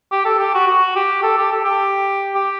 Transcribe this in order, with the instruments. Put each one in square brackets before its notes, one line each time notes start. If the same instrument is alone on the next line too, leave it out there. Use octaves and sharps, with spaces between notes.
[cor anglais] G4
A4
G4
F#4
F#4
G4
A4
G4
A4
G4
G4